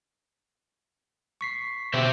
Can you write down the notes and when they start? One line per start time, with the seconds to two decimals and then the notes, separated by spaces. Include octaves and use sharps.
1.41 C#6 B6 C7
1.94 B2 G4 C5 E5